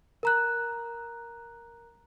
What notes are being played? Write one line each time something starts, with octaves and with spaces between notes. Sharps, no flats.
A#4 A#5 F#6